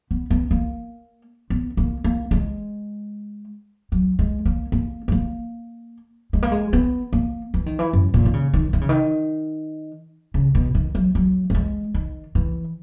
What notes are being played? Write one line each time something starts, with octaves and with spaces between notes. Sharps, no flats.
B3
B3
A#3
B3
A#3
A#3
G#3
F#3
G#3
A#3
A#3
G#3
A#3
G#3
A#3
G#3
B3
A#3
E3
D#3
E3
F#2
A#2
D#3
C#3
D#3
D#3
C#3
D#3
C#3
B2
D#3
F#3
F#3
A#3
G#3
D#3
E3